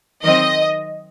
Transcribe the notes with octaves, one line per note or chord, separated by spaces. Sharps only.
D#3 F#3 C4 D#5